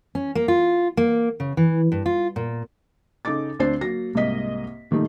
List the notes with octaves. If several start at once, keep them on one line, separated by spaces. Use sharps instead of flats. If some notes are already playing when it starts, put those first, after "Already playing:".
C#4
A#3
F4
A#3
C#3
E3
G2
F4
A#2
C#3 D#4 A4 D6 A6
D2 C4 D4 C5 A6 C7
F#3 A#3 A#6
C2 G#2 A#3 D#5 B6
A#2 D#3 G3 A3 D#4